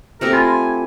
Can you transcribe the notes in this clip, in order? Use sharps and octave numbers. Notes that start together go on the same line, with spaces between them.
A3 C4 G4 A#4
F4 C5 G#5 B5 C6